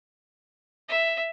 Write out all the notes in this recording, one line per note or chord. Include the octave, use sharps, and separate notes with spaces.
E5